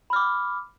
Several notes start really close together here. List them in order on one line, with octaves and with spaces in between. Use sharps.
B5 F6 D6